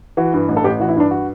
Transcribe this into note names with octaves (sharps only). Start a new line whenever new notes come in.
E3 F#4
G2
A1
A4
A1 G4
E3 F#4
E4
G2 D4
F#4